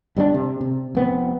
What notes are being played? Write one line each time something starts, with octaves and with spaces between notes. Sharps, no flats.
G1 G3 C4 D4
C3
C3
F1 B3 C4